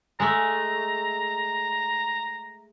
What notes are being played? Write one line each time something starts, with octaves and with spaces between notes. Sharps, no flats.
G#3 A3 A#5